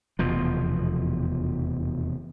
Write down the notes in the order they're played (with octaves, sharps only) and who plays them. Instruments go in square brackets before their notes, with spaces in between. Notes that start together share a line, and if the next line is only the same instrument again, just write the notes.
[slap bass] F1 E2 B2 F3